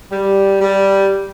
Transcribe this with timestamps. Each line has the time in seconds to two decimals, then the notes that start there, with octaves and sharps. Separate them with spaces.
0.11 G3
0.61 G3